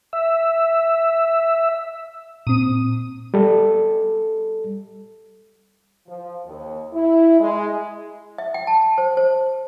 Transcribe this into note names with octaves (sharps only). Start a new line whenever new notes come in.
E5
A#2 C4 D#6
G3 A4
F3
D#2
E4
G#3
E5
G5
A5
C5
C5